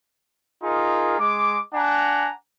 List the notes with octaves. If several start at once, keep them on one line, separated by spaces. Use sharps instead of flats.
D#4 F4 G#4 A#4
G#3 D6
D4 F#5 G#5 A#5